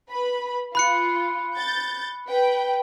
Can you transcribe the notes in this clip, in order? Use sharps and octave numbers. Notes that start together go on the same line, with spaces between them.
B4 B5
F4 B5 F#6 C#7
G6 A6
B4 G5